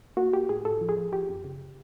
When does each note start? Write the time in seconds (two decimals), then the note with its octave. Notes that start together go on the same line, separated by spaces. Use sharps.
0.17 A#3 F#4
0.33 A#3 G4
0.49 A2 G#4
0.65 A2 A4
0.81 F3
0.89 G#4
0.97 F3
1.12 F3 G4
1.29 F#2
1.44 C#3